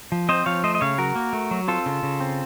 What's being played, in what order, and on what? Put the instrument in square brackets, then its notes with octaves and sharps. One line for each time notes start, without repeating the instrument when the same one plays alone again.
[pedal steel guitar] F3
C4 C5 D#5
F3 C#5 F5
A3 C5 D#5
D#5
C#3 C#5 F5
F#3 F#4 A#4
A#3
A3
F#3
C4 F4 A4
C#3
C#3
C4